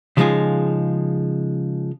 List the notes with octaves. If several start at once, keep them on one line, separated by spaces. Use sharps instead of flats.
C#3 F3 G#3 D#4 F4 G#4